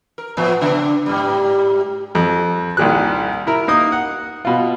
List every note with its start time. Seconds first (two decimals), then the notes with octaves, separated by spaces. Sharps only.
0.18 A#4
0.37 A2 F3 B3
0.61 C#3 B3 D4
1.06 G#2 G3
2.15 F2
2.77 C2 A#2 D#3 G#4 F#6
3.47 E4 A#4
3.68 A#3 D#4 D#6
3.92 F#5
4.45 B2 F4